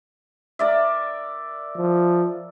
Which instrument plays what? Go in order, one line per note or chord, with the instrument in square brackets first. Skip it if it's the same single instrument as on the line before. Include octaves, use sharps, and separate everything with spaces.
[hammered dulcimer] A#4 D5 E5
[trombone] F3